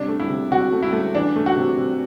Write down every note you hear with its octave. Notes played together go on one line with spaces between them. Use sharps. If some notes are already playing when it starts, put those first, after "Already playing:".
Already playing: C3 G3 D4
A3
E4
C3
C3 F#4
A3
E4
A3
E3 D4
A3
F#4
C3
C3